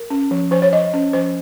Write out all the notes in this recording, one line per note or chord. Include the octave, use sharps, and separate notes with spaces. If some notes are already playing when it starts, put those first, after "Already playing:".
Already playing: A#4
C#4
F3
F3 C5
C#5
F3 D#5
C#4
F3 C5